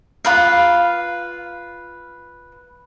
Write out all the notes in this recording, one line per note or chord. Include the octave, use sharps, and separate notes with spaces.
F4 B4 F5